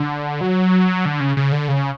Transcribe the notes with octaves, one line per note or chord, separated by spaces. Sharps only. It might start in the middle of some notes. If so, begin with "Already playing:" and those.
Already playing: D3
F#3
D3
C#3
C#3
D3
C#3